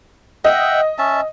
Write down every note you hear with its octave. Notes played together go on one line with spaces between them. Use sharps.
D#5 E5 F#5 G5
C#4 E5 A5